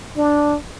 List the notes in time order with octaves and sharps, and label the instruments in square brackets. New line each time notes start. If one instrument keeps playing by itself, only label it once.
[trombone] D4